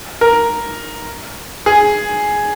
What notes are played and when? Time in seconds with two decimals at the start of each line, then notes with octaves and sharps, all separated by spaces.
0.21 A#4
1.66 G#4